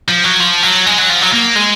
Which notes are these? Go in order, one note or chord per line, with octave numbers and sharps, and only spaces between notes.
F3
F#3
F3
F#3
G#3
F#3
F3
F#3
A#3
G#3